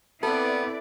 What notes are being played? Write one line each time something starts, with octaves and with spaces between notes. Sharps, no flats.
B3 C4 E4 A4 B4 D5